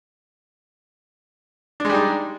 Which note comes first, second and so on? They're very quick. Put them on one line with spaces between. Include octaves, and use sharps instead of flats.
D4 G#3 G3 D#4